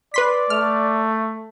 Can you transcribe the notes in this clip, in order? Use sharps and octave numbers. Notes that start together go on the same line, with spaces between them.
B4 D5 C6 B6
A3 F6